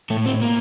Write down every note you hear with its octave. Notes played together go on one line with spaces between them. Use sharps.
A2 A3
C4
A#3